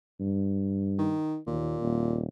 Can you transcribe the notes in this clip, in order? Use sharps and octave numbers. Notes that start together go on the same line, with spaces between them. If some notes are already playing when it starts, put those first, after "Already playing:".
G2
D#3
D#2 A#2
D#1